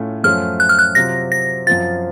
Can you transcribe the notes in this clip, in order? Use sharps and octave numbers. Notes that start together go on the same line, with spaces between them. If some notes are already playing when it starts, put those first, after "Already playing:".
Already playing: A2 A3 C#4 F4
F#2 F3 A3 C#4 F4 F6
F#6
F6
F#6
C3 F#3 C4 F4 A#6
A#6
F#2 F3 C4 F4 A6